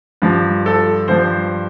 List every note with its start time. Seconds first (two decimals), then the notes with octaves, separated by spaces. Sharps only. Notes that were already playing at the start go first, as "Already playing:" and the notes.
0.22 G2 F3
0.66 A4
1.08 G2 F3 C5